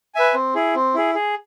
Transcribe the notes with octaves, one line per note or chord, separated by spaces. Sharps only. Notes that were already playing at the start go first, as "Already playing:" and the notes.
B4 E5 G#5
C4
E4 G#4
C4
E4 G#4
G#4